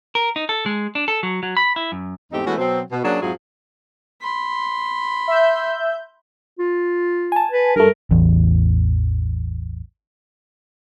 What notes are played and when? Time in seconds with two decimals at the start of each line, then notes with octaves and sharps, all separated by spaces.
0.15 A#4
0.36 D#4
0.49 A4
0.66 G#3
0.95 D4
1.08 A4
1.23 F#3
1.43 F#3
1.57 B5
1.76 E4
1.92 F#2
2.32 E2 G#2 A3 C4 D#4 G4
2.46 E3 G#3 A3 B3 C#4 F#4
2.58 B2 F#3 C4
2.92 B2
3.04 F#3 A#3 C#4 D4 F#4 G#4
3.22 F2 G#2 F3 F#3 E4 G#4
4.22 B5 C6
5.28 E5 G6
6.59 F4
7.32 G#5 A5
7.51 B4
7.76 G2 A3 A#4
8.11 A1 E2